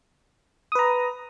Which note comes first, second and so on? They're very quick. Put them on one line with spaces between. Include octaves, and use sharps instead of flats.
D#6 B4 A#5